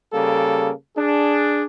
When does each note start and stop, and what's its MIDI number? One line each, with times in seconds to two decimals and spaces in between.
0.13 0.71 49
0.13 0.71 55
0.13 0.71 58
0.13 0.71 69
0.97 1.65 62
0.97 1.65 68